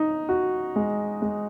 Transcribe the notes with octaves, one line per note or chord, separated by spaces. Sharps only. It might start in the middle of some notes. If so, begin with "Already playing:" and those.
Already playing: D#4
F#4
G#3
G#3